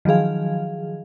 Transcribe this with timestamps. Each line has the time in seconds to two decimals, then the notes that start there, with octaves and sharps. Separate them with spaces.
0.05 D#3 F3 F#3 G#4 F5